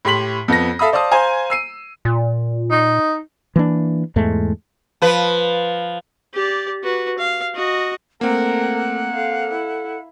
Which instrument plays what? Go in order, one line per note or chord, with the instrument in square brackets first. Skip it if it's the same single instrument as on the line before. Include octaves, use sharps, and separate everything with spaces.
[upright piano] A2 G4 C6 B6 F#7
F2 B3 A#6
A4 E5 F5 B5 D#6
C5 D5 F5 A5 D#6
C5 F5 G#5 A#5
E6 C7 D#7
[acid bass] A#2
[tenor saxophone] D#4
[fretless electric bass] E3 A#3 D4
E2 G#2 G#3 A3
[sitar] F3 B4
[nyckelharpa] G4 D5
F#4 B4
F5
F#4 D#5
[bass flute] A3 [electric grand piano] A#3 C4 [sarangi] A#4 [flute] F#5
[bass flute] A4 [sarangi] F5
[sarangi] E4